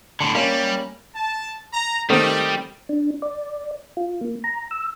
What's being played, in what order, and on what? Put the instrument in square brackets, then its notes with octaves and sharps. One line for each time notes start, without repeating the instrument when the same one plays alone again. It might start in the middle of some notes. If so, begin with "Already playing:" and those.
[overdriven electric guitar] A2 D3 [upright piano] A5 C6
[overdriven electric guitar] G3 [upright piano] A#3 C#4
[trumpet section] A5
A#5
[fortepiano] D#3 A3 C4 [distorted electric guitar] G3 [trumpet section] D#4 G4
[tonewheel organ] D4
D5
F4
A#3
A#5
E6